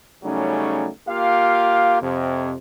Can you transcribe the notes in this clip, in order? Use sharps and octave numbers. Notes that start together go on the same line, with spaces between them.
C#3 F#3 G3 A3 C#4 D#4
A#3 F4 G4 F5
F2 C3